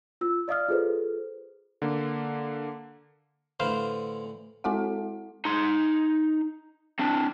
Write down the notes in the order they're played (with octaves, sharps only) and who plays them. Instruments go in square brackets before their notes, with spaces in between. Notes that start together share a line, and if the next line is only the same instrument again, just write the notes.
[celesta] F4 E6
D5 D#5 F5 D#6 F6
F4 G#4 A4 B4 C5
[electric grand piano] D3 A#3
[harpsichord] A2 D3 E3 [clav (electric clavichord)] B4 C5 F5
[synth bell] G#3 C4 E4 F#4 A4 F#5
[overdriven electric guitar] D#4 C6
C4 D4